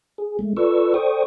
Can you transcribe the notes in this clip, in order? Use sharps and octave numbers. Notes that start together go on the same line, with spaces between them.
G#4
G#3 A3
F4 A4 B4 D5 C#6 E6
A4 C5 D5 G5 C#6 D#6